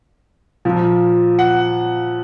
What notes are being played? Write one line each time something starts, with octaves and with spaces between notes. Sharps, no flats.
A#2 F3
F#5